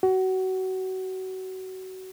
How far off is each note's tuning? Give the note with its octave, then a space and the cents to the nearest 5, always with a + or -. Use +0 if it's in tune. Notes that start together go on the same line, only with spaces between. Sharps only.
F#4 +25